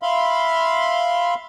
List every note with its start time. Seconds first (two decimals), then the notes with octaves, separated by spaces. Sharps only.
0.02 E5 F5 B5 C6